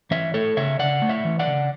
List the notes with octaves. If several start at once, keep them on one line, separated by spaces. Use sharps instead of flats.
E3 C#5 E5
A3 A4 C#5
C#3 C#5 E5
C#3 D5 F#5
A3
C#5 E5
E3
D5 F#5
C#3